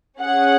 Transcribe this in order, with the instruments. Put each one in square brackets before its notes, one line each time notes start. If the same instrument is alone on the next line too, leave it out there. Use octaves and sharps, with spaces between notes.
[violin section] C#4 G#4 F#5